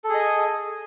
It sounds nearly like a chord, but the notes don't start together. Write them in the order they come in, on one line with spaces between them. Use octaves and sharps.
A4 G#4 D#5 G#5